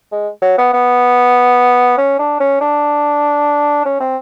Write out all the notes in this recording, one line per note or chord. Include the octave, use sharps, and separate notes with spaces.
G#3
F#3
B3
B3
C#4
D4
C#4
D4
C#4
C4